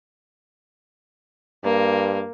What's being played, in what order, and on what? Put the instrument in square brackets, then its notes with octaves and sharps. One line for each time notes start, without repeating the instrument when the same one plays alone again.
[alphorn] G2 [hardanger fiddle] A#3